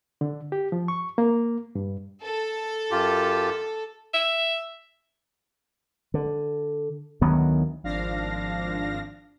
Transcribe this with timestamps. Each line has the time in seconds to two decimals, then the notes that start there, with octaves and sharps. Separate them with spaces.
0.21 D3
0.52 G4
0.72 F3
0.88 C#6
1.18 A#3
1.75 G2
2.22 A4
2.91 F#2 F4 G4
4.14 E5
6.14 D3
7.21 D2 D#3 F#3 B3
7.83 G#1 F3 D4 F5 A#6